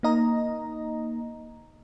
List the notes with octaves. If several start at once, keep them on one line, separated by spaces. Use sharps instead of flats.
A#3 D#4 D#5 A#5